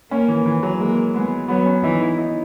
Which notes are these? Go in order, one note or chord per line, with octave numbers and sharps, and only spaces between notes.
A#3 C#4
E3
E3
F#3
G#3 A#3
G#3 B3
F#3 B3
C#4
E3 D#4
E4
D#4